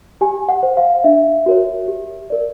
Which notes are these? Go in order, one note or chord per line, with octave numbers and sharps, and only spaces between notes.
G4 G#5
F#5
C5
F5
D4 E5
F#4 A#4 C#5
G4
A#4 D5